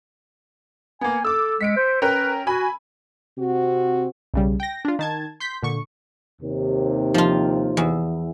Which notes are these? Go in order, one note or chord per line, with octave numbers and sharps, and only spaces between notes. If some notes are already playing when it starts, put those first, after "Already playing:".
A#3 B3 G#5
A4 D6 E6
G#3 B6 C#7 D7
C5
C#4 A#4 B4 G5
F#4 G#5 B5
C3 C4 F#4
B1 C#3 G3
G5 A#6
D4 F4
D#3 A5 G#6
C6 G6 B6
A#2 D3 C#6
D#2 C3
F3 F4
E2